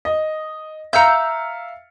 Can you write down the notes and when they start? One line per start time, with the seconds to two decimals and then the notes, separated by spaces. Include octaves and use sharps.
0.05 D#5
0.93 E5 F5 A#5 E6 G6 C#7